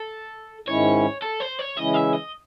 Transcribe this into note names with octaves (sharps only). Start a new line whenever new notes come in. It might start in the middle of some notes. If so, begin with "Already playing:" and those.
Already playing: A4
G#2 D#3 G#3 C#4 E4 C#5
A4
C5
C#5
C#3 E3 G#3 C#4 E4 D#5
E5
D#5